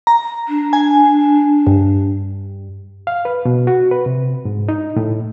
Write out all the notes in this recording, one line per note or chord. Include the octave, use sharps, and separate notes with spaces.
A#5
D4
G#5
G2
F5
B4
B2
F#4
B4
C3
G#2
D#4
A2